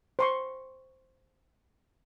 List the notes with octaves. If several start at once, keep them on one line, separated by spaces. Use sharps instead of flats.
C5 C6 C#6